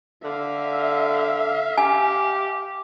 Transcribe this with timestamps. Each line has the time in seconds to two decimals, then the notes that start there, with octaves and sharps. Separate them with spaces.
0.24 D3 E5 F5
1.78 G4 G#5